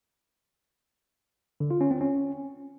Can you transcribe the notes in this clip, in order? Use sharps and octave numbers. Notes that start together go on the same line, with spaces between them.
D3
F4
C#4
C4
C#4